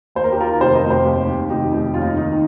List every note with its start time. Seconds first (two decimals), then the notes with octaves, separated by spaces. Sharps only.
0.15 D#2 C5
0.24 A#4
0.32 G4
0.38 D#3 F4 A#4
0.60 F1 G4 C5
0.75 A#4 D#5
0.83 F1
0.90 G4 C5
1.05 D#2
1.27 D#3
1.50 F1 D#4 G4
1.71 F1
1.94 D#2 F4
2.01 D#4
2.17 D#3 D#4